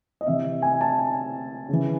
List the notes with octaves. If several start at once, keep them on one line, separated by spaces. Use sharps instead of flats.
D#5
C3 E3 E5
G#5
A5
G#5
C#3 E3